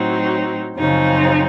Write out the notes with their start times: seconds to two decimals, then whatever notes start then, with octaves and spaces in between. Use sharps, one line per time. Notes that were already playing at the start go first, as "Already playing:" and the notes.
Already playing: A2 F#3 C4 D#4
0.77 F#2 C#3 F3 C4 D#4